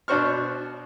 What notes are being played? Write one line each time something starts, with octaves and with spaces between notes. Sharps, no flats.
B2 D4 F#4 C5 C#6 F6